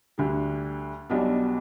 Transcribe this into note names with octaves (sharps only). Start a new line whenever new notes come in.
D2 D3 G3
B1 B2 G3 B3 D4